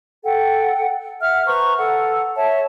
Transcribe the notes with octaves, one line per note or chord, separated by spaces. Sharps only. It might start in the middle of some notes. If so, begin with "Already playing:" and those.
A4 F#5 G5
E5 F#5 F6
B4 C5 A#5 C#6
A4 F#5
C#5 E5 A5